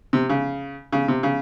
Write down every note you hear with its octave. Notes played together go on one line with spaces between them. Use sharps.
C3
C#3
C#3
C3
C#3